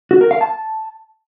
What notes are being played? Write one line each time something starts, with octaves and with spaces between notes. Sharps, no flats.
F#4
A#4
F5
A5